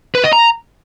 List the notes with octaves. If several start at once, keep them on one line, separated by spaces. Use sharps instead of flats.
B4
D#5
A#5